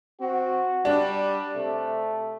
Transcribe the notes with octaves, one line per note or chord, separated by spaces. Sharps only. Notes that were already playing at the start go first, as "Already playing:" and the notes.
C4 F#4
G3 D4
C3 A3